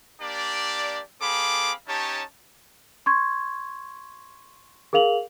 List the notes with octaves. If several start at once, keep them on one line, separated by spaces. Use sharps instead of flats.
A#3 D4 G4 D5
C4 G#4 A4 F5 B5 D6
C#4 D#4 G4 C#5 A5
C6 C#6 G#6
G#4 A#4 F5 F7 F#7